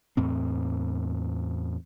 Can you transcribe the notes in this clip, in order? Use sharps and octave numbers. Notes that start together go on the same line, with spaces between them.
E2 A2 C4